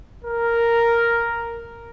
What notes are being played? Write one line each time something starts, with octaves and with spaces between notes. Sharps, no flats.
A#4